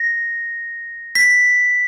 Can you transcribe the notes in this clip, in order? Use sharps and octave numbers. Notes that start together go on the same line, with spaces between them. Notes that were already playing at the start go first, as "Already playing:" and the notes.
Already playing: A#6
B6